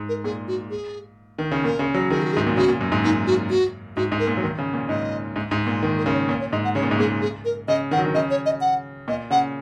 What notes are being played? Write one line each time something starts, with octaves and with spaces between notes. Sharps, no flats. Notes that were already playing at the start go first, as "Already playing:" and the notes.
Already playing: G#2
A#4
A#2 G#4
F#4
G#4
D#3
C#3
A#2 A#4
C#3
F#3
D#3 G#4
F#4
G#4
G#2
A#2
C#3 F#4
A#2
F#2
G#2
A#2 D#4
F#4
F#4
G#2 F#4
G#2
A#4
A#2
F#3
D#3
C#3
A#2
G#2 D#5
G#2
G#2
A#2
D#3
A#4
C#3
C#5
A#2 C#5
C#5
G#2 D#5
F#5
C#3 C#5
A#2
G#2
A#2 G#4
G#4
A#4
C#3 D#5
D#3 F#5
F#3
D#3
C#3 D#5
C#5
D#5
F#5
A#2 D#5
C#3 F#5